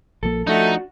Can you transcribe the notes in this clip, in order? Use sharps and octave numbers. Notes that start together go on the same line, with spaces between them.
A#1 F3 A#3 A4
F3 A3 D4 D#4 F#4